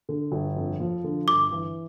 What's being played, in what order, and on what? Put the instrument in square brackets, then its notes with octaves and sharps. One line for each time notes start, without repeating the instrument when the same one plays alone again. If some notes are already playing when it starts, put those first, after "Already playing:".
[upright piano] D3
G1
F2
F3
D3
[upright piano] G1 [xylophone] D6
[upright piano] E3